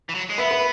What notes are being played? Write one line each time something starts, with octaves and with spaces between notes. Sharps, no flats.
E3
F#3
G#3
B3 B4 E5
B4